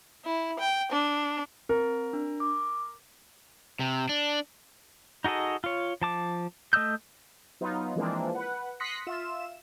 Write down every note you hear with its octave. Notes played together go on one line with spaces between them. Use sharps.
E4
G5
D4
C4 A#4
D4
D6
C3
D4
D#4 F#4 G#4 A4 D#5
F4 C#5
F3 A5 D6
A3 D#5 D#6 E6 G6
F#3 B3 D#4 F4
E3 F3 G#3 A#3 C4 D4
B4 F#5
C6 D#6 F#6 A#6 B6 C#7
F4 E5 E7